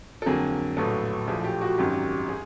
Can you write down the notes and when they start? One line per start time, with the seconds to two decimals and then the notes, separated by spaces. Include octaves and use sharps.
0.22 A4
0.26 F2 D3 F#3 A#3 G#4
0.77 A#1 A2 F#3 B3 A4
1.27 A#1 A2 F3 A3 G#4
1.44 G4
1.61 F#4
1.78 G#1 F#2 D#3 F#3 G4
2.29 G#4